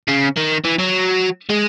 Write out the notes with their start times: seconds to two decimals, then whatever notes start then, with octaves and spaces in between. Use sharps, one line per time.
0.08 C#3
0.37 D#3
0.65 E3
0.79 F#3
1.50 G#3